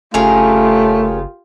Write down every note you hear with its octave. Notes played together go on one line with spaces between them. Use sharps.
F#1 A3 C#4 F4 G4 G#4 A#4